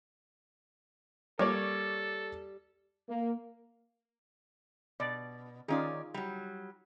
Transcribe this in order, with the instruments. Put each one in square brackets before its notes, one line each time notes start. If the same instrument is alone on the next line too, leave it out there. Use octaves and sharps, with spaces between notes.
[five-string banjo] G3 [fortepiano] A#3 C#5 D5 [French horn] A4
[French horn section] A#3
[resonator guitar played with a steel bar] B2 [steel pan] D5
[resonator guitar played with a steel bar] D#3 C#4 D5 [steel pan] D#4 F4 G#4
[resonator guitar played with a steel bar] F#3 G3